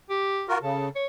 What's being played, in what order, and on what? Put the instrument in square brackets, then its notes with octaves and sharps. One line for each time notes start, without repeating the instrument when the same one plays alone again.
[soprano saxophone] G4
[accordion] F4 F#4 A#4
[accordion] C#3 [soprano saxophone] A4
[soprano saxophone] C#5